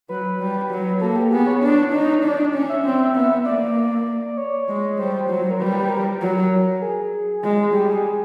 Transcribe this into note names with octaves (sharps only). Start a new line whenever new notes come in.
F#3 B4
G3
F#3
A#3 A4
G4
B3 G#4
C#5
D4
D#4
D4 D5
D5
C#4
E5
C4
B3
A#3 D5
C#5
G#3
G3 C5
F#3
A#4
G3 B4
B4
A#4
A#4
F#3
G#4
G#3
G3 G4
G#4
G#4